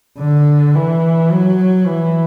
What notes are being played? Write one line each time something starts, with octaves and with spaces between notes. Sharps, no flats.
D3
E3
F#3
E3